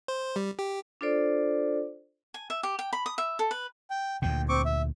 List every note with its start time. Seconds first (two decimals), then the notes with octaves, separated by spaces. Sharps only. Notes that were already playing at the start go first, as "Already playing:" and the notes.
0.08 C5
0.36 G3
0.59 G4
1.01 D4 F4 A4 C5 D5
2.34 G#5
2.50 E5
2.63 G4
2.79 G5
2.93 B5
3.06 D#6
3.18 E5
3.39 A4
3.51 B4
3.90 G5
4.22 D2 A#2 G5
4.49 C4 C#6 D6
4.65 E5